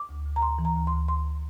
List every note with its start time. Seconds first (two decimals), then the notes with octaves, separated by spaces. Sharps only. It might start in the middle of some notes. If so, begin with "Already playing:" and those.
Already playing: D6
0.09 D2
0.26 D2
0.36 A#5
0.42 D2 C6
0.59 E3
0.65 A#5
0.76 D2
0.87 C6
0.93 D2
1.08 D2 C6